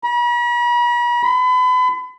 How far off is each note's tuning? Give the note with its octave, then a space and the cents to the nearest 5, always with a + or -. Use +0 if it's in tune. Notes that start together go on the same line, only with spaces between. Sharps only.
B5 -45
B5 +35